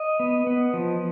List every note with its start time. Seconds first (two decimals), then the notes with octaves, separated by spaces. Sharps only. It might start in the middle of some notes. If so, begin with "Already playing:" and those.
Already playing: D#5
0.20 B3
0.47 B3
0.74 F3